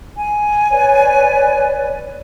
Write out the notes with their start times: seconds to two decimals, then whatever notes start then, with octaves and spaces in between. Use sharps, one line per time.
0.17 G#5
0.70 B4 C#5 D5